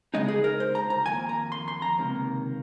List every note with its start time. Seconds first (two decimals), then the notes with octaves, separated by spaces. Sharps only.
0.14 C#3 G#3 D#4 D#5
0.28 G#4
0.44 A#4
0.60 C5
0.75 A#5
0.90 A#5
1.06 F2 D#3 A#3 G#5
1.29 A#5
1.52 C6
1.68 C6
1.82 A#5
1.98 C#2 C3 D#3 A#3